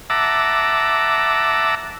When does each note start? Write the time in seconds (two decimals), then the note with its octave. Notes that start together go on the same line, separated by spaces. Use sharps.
0.10 E5 F#5 A5 A#5 D6 E6